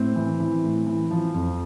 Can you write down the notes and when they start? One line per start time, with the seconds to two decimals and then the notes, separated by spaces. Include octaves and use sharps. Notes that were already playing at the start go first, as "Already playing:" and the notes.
Already playing: A2 C4
0.16 E3
0.40 E3
0.64 A2
0.87 E3
1.11 F3
1.34 F2